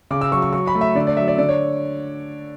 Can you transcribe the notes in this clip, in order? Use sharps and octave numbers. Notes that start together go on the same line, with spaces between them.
C#3 D6
E6
F#3 C#6
C#6
F#3 C#6
B5
A3
E5
D3 D5
D5
F#3 E5
D5
D3 D5
C#5